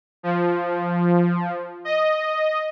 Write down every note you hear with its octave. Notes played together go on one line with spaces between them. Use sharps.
F3
D#5